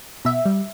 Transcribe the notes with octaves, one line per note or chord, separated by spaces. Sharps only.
B2 E5
G3